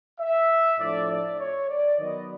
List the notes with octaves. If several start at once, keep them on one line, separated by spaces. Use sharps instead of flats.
E5
A2 F3 A3 D4 D5
D5
C#5
D5
D#3 F#3 B3 D#5